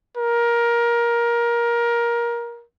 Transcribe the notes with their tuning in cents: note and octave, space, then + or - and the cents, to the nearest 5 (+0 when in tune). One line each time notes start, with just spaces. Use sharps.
A#4 +20